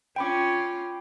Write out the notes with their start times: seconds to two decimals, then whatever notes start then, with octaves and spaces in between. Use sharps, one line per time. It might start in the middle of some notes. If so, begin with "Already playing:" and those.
0.16 C#4 F4 G5 B5 D6